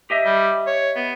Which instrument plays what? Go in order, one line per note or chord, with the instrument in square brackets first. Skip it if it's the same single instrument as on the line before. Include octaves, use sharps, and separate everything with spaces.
[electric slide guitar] G4 D#5 E5
[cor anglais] G3
C#5
B3